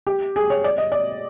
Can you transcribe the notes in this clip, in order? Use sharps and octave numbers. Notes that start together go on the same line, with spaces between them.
G4
G#4
C#5
D5
D#5
D5